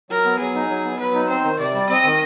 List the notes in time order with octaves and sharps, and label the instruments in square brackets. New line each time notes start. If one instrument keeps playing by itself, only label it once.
[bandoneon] F#3 [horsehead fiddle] A#4
[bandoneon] B3
[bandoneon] F#3 [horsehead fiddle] G#4
[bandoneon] D#4
F#3
B3
[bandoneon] F#3 [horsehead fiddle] B4
[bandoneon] D#4
[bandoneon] C4 [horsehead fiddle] C5
[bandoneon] D#3
[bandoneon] C3 [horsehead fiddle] D5
[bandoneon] G3
[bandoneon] C4 [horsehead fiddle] D#5
[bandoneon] D#3